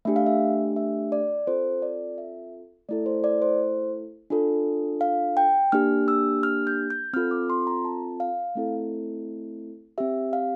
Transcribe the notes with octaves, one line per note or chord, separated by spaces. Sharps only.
A3 D4 G4 E5
F5
E5
E5
D5
C4 F4 A4 C5
D5
E5
A3 E4 A4 D5
C5
D5
C5
D4 F4 A4
F5
G5
A#3 D4 G4 F6
E6
F6
G6
G6
C4 F4 A4 F6
D6
C6
A#5
A5
F5
A3 C4 E4 A4
C4 G4 E5
F5